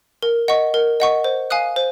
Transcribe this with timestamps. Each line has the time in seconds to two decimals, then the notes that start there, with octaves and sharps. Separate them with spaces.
0.22 A#4
0.48 D#5 F#5 C#6
0.74 A#4
1.00 D#5 F#5 C#6
1.24 C5
1.50 F5 G#5 D#6 F#6
1.76 C5